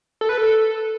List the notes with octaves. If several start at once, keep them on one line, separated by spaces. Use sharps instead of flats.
A4
B4
A4